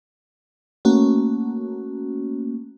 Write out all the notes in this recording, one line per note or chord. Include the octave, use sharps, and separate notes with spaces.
A3 A#3 C#4 F#4